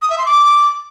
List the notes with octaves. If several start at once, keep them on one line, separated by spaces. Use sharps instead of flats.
D#6
E5
C6
D6